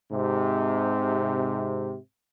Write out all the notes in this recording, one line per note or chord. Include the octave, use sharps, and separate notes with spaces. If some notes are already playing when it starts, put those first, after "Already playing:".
G#2 C3